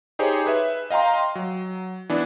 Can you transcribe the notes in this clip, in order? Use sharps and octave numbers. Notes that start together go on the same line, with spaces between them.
D#4 G4 G#4 C5 C#5
B4 E5
D#5 F5 G5 A#5 C6
F#3
E3 B3 D4